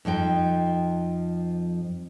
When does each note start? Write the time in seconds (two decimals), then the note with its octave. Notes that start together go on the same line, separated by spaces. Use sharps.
0.05 F2 F3 D#4 G5